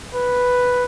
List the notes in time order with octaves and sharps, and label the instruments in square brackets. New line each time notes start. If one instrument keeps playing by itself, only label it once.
[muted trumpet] B4